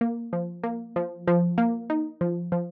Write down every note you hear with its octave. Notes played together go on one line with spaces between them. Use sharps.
A#3
F3
A#3
F3
F3
A#3
D#4
F3
F3